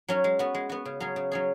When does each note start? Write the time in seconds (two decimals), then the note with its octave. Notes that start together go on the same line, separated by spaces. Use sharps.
0.08 F#3 C#4 F#4
0.24 G#3
0.39 B3 F#4
0.55 G#3
0.69 B3 F#4
0.85 C#3
1.00 F#3 C#4 G#4
1.16 C#3
1.31 F#3 C#4 G#4